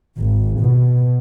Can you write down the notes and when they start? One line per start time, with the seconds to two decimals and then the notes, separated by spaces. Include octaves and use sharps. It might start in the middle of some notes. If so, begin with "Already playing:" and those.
0.20 G#1
0.61 B2